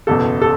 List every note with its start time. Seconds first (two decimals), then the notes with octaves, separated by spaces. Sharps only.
0.07 F#1 E2 B2 A4
0.42 A4